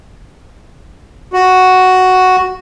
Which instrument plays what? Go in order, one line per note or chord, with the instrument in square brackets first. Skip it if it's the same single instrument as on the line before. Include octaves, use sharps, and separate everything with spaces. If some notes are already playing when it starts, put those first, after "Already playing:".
[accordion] F#4